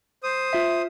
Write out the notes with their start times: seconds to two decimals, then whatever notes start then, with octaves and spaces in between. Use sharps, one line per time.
0.23 C5 D#6
0.53 F4 E5